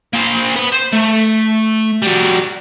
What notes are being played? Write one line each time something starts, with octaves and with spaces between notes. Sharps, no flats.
A#3 C5
B3 B5
C5
A3
G3 F#4